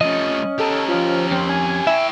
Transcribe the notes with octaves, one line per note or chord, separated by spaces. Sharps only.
F3 A3 C#4 D#5
G4 A4 A#4
F3
F2 C4
G#5
E4 E5 G5